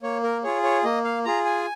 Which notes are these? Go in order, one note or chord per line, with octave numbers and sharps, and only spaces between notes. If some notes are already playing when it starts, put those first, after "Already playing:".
A#3 C#5
A#4
F4 G#4 C#5
C#5
A#3 D#5
F5
F4 G#4 A#5
G#5